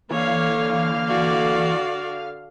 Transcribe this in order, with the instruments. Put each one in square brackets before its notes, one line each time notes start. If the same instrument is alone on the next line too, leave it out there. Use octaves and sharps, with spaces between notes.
[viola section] D3 F5 [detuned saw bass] E3 [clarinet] A#3 [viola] C#5
[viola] F#4 D5